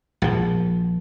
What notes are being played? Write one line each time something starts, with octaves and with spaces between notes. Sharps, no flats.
A#1 F3